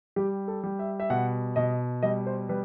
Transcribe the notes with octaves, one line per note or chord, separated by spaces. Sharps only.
G3 G4
A4
G3
E5
E5
B2 F#5
B2 D#5
G3 D#5
C5
G3 B4